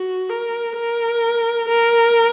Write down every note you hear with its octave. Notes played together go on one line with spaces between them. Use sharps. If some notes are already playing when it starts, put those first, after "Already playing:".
Already playing: F#4
A#4
A#4
A#4